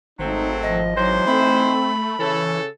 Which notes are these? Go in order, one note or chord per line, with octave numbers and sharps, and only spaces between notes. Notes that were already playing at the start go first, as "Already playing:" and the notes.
G#1 F#3 A3 C4 D#4
F3 D#5
E3 F#3 D#4 C5
A3 C4 B5
C#3 E3 A4 C#5